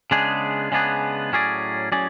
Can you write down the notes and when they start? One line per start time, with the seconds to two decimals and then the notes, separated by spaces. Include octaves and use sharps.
0.11 C#3 G#3 B3 D4 G#4
0.72 C#3 G#3 B3 D4 G#4
1.32 A2 F#3 C#4 G#4 D5
1.92 A2 F#3 C#4 G#4 D5